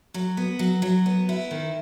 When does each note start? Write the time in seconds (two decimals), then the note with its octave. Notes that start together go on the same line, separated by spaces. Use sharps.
0.14 F#3
0.37 B3
0.59 F#3
0.82 F#3
1.06 B3
1.29 E4
1.51 D#3